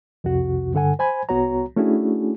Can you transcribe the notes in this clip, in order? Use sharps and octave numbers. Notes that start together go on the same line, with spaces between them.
C2 F2 C3 F#4
G2 D3 A4 F#5 G#5
C5 G#5 B5 G#6
C2 B3 F#4 C#5 A#5
A3 C#4 D4 E4 F#4 G#4